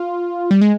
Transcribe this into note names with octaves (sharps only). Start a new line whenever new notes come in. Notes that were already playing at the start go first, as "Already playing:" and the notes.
Already playing: F4
G3
G#3